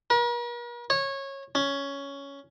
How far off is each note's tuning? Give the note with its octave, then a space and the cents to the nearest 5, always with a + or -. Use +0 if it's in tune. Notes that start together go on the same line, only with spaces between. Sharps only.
A#4 +45
C#5 -20
C#4 +10